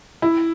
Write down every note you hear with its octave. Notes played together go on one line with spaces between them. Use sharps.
E4